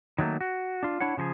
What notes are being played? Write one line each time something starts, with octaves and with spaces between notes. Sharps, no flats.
D#3 F#3 A3 A#3
F#4
D4 F4
D4 E4 C#5 F#5
C#3 F3 F#4 G#4